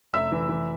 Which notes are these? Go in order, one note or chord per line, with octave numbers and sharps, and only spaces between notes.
F1 E5 E6
E3
E3